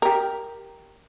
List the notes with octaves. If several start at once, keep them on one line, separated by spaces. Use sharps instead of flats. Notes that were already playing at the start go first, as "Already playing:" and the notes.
G4 A#4